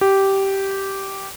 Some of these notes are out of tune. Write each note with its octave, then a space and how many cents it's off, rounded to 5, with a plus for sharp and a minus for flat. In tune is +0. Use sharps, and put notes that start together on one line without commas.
G4 -10